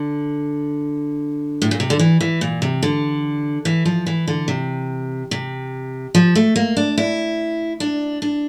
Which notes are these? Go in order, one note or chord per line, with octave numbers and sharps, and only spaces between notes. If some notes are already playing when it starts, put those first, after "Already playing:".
Already playing: D3
A2
A#2
C3
D3
E3
E3
A#2
C3
D3
E3
F3
E3
D3
C3
C3
F3
A3
A#3
D4
E4
D4
D4